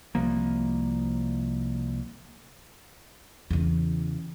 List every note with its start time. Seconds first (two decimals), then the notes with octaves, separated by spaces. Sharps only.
0.15 C2 C3 F3 A#3
3.50 E2 C#3